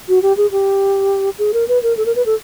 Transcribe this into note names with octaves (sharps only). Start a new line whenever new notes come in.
F#4
G4
G#4
G4
G#4
A#4
B4
A#4
A4
A#4
B4
A4